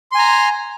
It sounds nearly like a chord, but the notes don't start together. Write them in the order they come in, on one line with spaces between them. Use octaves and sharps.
C6 G#5 A#5